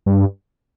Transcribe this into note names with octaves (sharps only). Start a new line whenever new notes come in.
G2